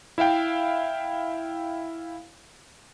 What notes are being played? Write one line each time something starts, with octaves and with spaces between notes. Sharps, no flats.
E4 E5 F5 G5